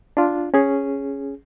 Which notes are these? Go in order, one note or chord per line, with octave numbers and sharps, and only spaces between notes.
D4 F4
C#4 G#4